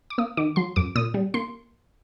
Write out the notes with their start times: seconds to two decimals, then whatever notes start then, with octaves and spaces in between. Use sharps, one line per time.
0.10 D6
0.18 A#3 D#6
0.37 D#3 D6
0.56 F#3 C6
0.76 F#2 D6
0.95 A#2 D#6
1.14 G3
1.34 A#3 C6